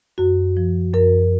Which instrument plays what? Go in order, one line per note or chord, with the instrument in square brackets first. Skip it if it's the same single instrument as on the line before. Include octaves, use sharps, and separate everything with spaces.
[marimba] F#2 F#4
F3
F#2 A#4